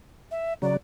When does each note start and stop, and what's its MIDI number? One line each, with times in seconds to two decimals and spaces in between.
0.31 0.53 76
0.62 0.77 49
0.62 0.77 54
0.62 0.74 74